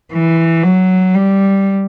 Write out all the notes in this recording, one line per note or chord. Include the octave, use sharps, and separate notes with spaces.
E3
F#3
G3